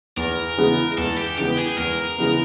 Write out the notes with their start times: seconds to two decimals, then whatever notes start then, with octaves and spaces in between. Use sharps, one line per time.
0.17 E2 A#4
0.58 C#3 E3 G#3 B3
0.98 E2 A4
1.18 G4
1.38 C#3 E3 G#3 B3 G4
1.59 G#4
1.78 E2 A#4
2.18 C#3 E3 G#3 B3